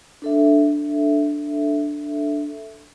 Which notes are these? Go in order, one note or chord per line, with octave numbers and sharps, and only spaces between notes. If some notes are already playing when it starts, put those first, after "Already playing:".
D4 A4 E5